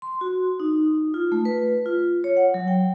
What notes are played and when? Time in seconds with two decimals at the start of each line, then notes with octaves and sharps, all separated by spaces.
0.02 C6
0.21 F#4
0.60 D#4
1.14 F4
1.32 A3
1.45 B4
1.86 F4
2.24 C#5
2.37 F#5
2.54 F#3
2.68 G5